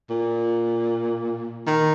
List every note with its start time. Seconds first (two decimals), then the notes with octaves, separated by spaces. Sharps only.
0.10 A#2
1.67 D#3